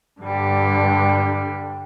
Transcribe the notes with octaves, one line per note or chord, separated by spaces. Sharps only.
G2 D3 G3